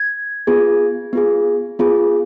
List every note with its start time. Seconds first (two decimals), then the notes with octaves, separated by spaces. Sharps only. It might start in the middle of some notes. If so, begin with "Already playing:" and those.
Already playing: G#6
0.47 B3 F4 G#4
1.13 B3 F4 G#4
1.79 B3 F4 G#4